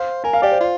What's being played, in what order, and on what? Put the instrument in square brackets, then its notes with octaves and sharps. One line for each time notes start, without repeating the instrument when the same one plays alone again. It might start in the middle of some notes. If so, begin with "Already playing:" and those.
Already playing: [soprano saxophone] C5 [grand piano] F5
[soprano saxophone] A#4 [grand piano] G#5
[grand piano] F5
[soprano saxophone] G4 [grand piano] D5
[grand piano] C5
[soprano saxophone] F4